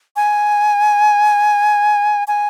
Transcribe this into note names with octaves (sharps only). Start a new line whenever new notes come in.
G#5
G#5